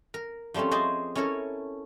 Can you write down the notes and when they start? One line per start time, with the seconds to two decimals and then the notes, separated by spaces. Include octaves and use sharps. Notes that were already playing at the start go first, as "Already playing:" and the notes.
0.14 A#4
0.54 F3 G3 A3 C4 C#4
0.71 G#4 C5 D5 D#5 G#5
1.15 C#4 E4 A4 A#4 C#5